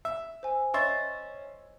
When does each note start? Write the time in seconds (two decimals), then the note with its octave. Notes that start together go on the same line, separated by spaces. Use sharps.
0.05 E5
0.43 C5 G#5
0.74 C#4 D#5 E5 C6 C#6 A6